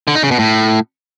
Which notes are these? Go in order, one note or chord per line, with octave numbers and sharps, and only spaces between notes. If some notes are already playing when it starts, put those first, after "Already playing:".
D3
D#4
C#3
B2
A2